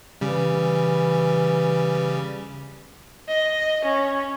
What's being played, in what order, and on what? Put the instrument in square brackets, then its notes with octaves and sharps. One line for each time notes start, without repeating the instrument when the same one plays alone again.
[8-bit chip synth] C#3 G3 [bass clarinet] E3
[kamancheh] D#5
C#4